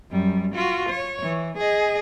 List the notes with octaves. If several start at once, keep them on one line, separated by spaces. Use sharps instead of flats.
F#2 G3
F4 F#4
C#5
E3
G#4 D#5